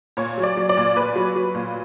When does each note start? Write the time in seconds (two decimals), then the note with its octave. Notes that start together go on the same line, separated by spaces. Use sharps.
0.17 A#2 C#5
0.38 F#3
0.43 D5
0.57 F#3
0.69 D5
0.77 A#2
0.96 A#2 B4
1.16 F#3
1.36 F#3
1.55 A#2